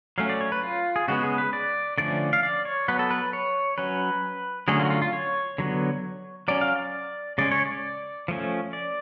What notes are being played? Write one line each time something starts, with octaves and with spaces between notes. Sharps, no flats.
F#3 A3 C#4 F5
D5
C#5
B4
F4
G#4
C#3 G#3 B3 F#4
G#4
B4
D5
D3 F3 A3 C#4 D5
F5
D5
C#5
F#3 B3 B4
A4
B4
C#5
F#3 C#4 B4
D3 F#3 A3 C#4 G#4
F4
F#4
F4
F4
C#5
D3 F#3 B3
F#3 C#4 D5
F5
D5
C#3 G#3 C#4 D5
C#5
D5
F3 A3 C#4
D5